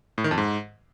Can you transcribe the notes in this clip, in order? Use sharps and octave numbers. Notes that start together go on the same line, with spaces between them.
A2
D#3
F2
G#2